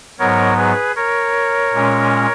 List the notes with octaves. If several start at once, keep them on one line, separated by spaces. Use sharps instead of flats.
G#2 F#3 B3 A#4 C#5
G#4 B4
A#4 C#5
A#2 G#3 C#4